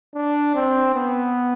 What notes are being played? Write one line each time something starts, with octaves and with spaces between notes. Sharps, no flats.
D4
C4
B3